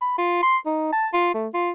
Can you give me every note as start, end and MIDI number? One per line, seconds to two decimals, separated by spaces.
0.01 0.15 83
0.18 0.40 65
0.43 0.57 84
0.66 0.92 63
0.93 1.08 81
1.13 1.33 65
1.34 1.48 57
1.54 1.71 65